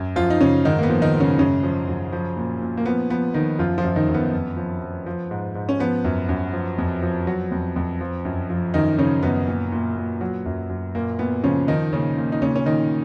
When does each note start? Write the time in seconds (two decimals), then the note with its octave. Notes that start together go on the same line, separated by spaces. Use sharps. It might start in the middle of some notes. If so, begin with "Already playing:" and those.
Already playing: F#2
0.16 F#2 F3 F4
0.30 D#4
0.40 F#2 C#3 C#4
0.65 G#2 D#3 D#4
0.78 A#3
0.83 B3
0.90 F3
1.02 D#3 D#4
1.14 G#2
1.20 C#3 C#4
1.39 F#2 C#3 C#4
1.63 F3
1.88 F#2
2.13 F3
2.37 A#2
2.61 A#2
2.77 A#3
2.86 F3 B3
3.10 F3 B3
3.34 D#3 F3 D#4
3.59 F#2 F3 F4
3.78 F3 F4
3.84 F#2
3.96 D#3 D#4
4.08 F#2
4.14 B3
4.33 F2
4.57 F3
4.82 F3
5.06 F3
5.31 G#2
5.55 G#2
5.69 C#4
5.80 F3 B3
6.05 F#2
6.29 F#2
6.53 F3
6.78 F2
7.02 F3
7.27 F#3
7.51 F2
7.76 F2
8.01 F3
8.25 F#2
8.50 F3
8.74 F#2 D#3 D#4
8.98 C#3 F3 C#4
9.22 F#2 B3
9.48 A#2
9.72 A#2
9.97 A#2
10.21 F#3
10.46 F#2
10.70 F#2
10.95 A#2 A#3
11.19 A#2 B3
11.44 C#3 F3 C#4
11.68 D#3 F3 D#4
11.93 A#2 C#3 C#4
12.17 A#2
12.32 D#4
12.42 A#2 C#3 C#4
12.56 C#4
12.66 A#2 D#3 D#4